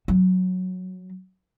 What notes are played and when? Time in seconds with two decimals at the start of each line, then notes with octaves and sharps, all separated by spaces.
0.08 F#3